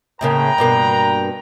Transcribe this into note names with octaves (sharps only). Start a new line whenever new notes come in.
A2 C#3 A#3 B4 G5 A#5
G2 B2 A#3